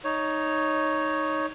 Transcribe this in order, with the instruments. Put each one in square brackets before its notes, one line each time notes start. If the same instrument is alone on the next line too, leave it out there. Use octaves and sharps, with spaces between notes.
[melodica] D#4 C#5